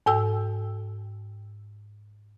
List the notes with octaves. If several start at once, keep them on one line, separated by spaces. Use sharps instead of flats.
G#2 A4 G5 E6